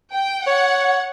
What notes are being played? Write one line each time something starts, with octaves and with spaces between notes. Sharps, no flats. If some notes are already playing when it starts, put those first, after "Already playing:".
G5
C#5 F#5